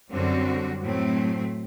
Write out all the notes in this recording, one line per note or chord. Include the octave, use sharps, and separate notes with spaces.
F#2 D3 G3 C4 F#4
A2 F#3 A3 C4